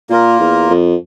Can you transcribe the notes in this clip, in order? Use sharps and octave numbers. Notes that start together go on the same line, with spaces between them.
A#2 A#3 F4 A#4
E2
F2